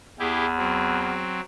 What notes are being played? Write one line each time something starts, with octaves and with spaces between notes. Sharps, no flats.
E2 E4 G4 G#4
F#3 C4